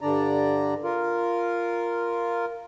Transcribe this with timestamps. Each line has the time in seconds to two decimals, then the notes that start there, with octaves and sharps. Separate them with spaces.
0.01 G2 D3 D4 D5 A#5
0.84 F4 A#4